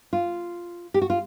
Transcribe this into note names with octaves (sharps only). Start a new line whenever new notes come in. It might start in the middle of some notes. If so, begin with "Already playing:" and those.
F4
G4
F#4
F4